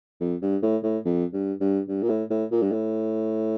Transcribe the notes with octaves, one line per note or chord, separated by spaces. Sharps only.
F2
G2
A2
A2
F2
G2
G2
G2
A#2
A2
A2
A#2
G2
A2